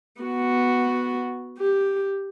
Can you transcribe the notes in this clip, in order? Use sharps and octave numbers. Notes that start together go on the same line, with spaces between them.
B3 F#4
G4